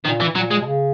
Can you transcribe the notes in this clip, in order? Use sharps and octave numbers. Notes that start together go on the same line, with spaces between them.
A#2 D#3
E3
A#2 F#3
G#3
B2
C#3